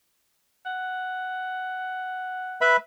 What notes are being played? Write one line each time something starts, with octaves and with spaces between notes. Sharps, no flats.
F#5
B4 E5 B5